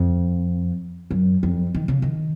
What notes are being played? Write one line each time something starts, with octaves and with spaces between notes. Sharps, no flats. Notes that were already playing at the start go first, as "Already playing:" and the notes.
Already playing: F2
F#2
F2
D#3
C#3
D#3